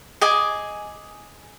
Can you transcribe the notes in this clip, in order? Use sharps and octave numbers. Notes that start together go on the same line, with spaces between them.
G#4 D#5 G#5 D6